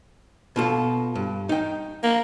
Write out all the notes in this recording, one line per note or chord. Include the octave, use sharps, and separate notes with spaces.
B2 F4 A4
G2
D#4 G5
A#3